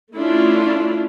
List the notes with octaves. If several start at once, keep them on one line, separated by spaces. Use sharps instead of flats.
A3 C#4 D4 E4 F4